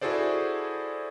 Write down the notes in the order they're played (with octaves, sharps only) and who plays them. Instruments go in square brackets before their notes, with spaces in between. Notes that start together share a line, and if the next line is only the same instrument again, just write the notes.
[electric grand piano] E4 F#4 G#4 A4 C5 D5